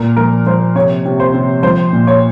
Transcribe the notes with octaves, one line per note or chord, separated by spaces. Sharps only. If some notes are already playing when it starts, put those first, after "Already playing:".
Already playing: A#2 A#4
F3 A#4
F3 C5
C3 C#5
C3
C5
C3
F3 C5
A#2
C#5